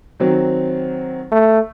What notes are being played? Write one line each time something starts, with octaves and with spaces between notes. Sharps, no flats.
D#3 F#3 C4
A3